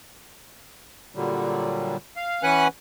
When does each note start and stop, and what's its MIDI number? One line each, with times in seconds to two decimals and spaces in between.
1.15 1.97 46
1.15 1.97 50
1.15 1.97 54
1.15 1.97 55
2.16 2.43 77
2.43 2.68 52
2.43 2.68 61
2.43 2.68 71
2.43 2.68 78
2.43 2.68 80
2.43 2.68 90